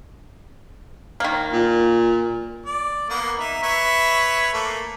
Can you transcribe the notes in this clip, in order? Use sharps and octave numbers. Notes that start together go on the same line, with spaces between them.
D#3 A#3
A#2
D5
A#3 B3
D#4 E5
B4 C#5 E5
A3 A#3